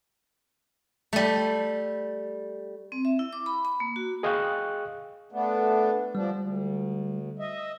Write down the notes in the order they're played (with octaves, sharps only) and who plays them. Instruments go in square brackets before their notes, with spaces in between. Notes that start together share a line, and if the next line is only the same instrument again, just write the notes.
[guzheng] G3 A3
[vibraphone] C4
E5
E4
D6
B5
B5
A#3
F#4
[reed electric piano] G#4 D#5 F5 G5 C#6 F#6
[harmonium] A3 B3 D4
[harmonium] F3 D4 [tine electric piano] G3
[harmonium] D2
D#5 E5